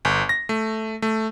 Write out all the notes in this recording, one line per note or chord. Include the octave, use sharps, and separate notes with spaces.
G1
A#6
A3
A3